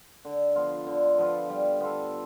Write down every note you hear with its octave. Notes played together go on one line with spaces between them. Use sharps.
D3
F3 B3 F4
D3
F3 B3 F4
G3
B3 F4 A4